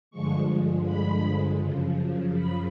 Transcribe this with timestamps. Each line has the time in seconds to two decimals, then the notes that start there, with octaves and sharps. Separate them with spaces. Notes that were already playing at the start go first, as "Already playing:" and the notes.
0.11 G2 D3 F3 G#3 C#6
0.85 B5
1.60 F#2 C#3 F3
2.34 B5